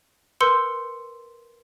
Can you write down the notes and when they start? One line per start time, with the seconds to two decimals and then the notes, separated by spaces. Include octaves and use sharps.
0.41 A#4 B4 C6 E6 G6 C#7